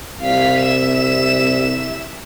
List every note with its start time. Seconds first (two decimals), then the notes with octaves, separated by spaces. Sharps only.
0.22 C2 F5 B6
0.62 E5 E7